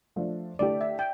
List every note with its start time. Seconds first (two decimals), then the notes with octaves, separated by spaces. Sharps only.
0.16 F3 A3 D4
0.59 D3 A3 E4 G4 D5
0.81 E5
0.99 G5